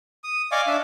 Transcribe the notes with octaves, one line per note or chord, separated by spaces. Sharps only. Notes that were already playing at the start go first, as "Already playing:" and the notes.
D#6
D5 D#5 F5 G#5 C#6 D6
D4 E5